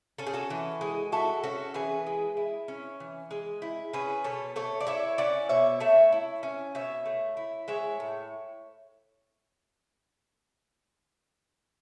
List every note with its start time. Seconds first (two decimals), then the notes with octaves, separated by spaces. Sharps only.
0.18 C#4 A4
0.27 G#4
0.34 F#4 A4
0.50 E3
0.81 G#3
1.12 E4 F#4 A4
1.44 C#4 F#4 A4
1.74 E3 G#4 B4
2.07 G#3
2.37 E4
2.68 C#4
3.00 E3
3.31 G#3
3.62 E4
3.93 C#4 G#4 B4
4.24 B2 A4 C#5
4.56 A3 A4 C#5
4.80 D5
4.87 E4 C#5 E5
5.18 C#4 D5 F#5
5.49 B2 C#5 E5
5.80 A3 C#5 E5
6.12 E4
6.43 C#4
6.75 B2 C#5 E5
7.06 A3
7.37 E4
7.68 G#3 C#5 E5
8.00 A2